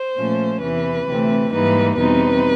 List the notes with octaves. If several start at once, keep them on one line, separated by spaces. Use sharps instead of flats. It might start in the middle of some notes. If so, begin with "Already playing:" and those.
Already playing: C5
A#2 F3 A3 C#4
E2 C3 E3 B4
D2 C3 E3 A3 C4
G#2 E3 G3 A#3 D#4 B4
E2 B2 G3 C4 D#4 B4